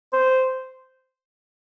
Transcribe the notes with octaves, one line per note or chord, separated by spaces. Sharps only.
C5